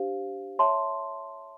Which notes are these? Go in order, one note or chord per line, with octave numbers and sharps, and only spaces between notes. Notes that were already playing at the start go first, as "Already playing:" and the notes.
Already playing: D4 G4 C5 F5
C#5 E5 A5 C6